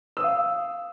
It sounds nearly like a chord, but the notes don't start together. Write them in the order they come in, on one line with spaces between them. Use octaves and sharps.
E6 D#6 F5